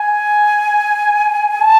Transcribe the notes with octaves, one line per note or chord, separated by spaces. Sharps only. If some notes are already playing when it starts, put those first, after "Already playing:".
Already playing: G#5
A5